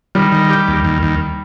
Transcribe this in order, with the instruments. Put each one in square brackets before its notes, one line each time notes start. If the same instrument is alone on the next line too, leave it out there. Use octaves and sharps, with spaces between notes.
[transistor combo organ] D#3 [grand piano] G3
[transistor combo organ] D#3
G4
D#2
D#2
D#2